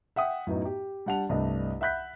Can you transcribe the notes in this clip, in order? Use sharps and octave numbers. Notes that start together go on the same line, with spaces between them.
E5 F#5 G5 D#6
F#2 A2 B3 D#4
G4
G3 D4 F#5 A5 F7
C2 G2 A3 D4 D#5
E5 F#5 B5 F#6 G6 B6